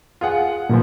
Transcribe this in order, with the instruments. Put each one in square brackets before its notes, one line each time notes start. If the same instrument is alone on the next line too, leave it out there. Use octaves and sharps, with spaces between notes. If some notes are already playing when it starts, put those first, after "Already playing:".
[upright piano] F4 G#4 F#5
[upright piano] F#2 E3 F3 [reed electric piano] A#2